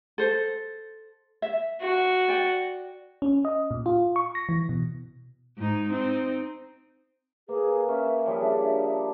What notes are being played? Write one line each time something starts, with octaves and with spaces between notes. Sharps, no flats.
A4 C5
E5
F#4
D5 G5
C#4
D#5
A#2
F4
C#6
A#6
E3
B2
G#2 D#4
C4 D#4
A#3 G#4 B4
C#4 E5
F3 G3 G#4 C#5
D4